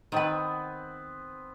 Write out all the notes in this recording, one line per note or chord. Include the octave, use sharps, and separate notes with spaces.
D#3 B3 C4 B4